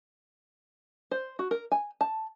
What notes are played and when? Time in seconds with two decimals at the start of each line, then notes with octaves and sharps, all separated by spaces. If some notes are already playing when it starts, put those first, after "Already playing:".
1.11 C5
1.39 F#4
1.51 A#4
1.72 G#5
2.01 A5